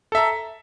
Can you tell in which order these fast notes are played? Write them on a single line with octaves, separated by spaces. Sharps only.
A4 E5 A#5